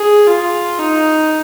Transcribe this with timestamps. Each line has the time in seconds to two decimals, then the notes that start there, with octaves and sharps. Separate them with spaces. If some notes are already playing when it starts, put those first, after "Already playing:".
Already playing: G#4
0.27 F4
0.79 D#4